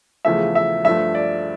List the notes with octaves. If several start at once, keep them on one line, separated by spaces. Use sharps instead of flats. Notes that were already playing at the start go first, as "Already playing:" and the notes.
E2 C#3 F3 A3 E5
E5
G2 F3 A3 E5
D5